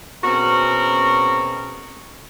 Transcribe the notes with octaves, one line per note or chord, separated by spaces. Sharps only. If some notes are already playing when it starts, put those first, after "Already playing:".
B2 C4 C#4 F#4 G#4 A#4